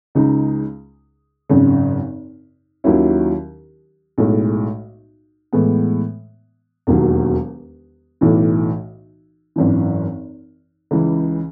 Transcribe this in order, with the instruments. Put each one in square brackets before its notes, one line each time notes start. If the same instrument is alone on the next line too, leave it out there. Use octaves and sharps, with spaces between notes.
[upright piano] C#2 C#3 G#3 D#4
G#1 F#2 C#3
D#2 D#3 F#3 C#4 E4
B1 A2 G#3
A2 E3 G#3 B3
E1 D#2 D#3 F#3
B1 A2 E3
G#1 F#2 E3
C#2 C#3 E3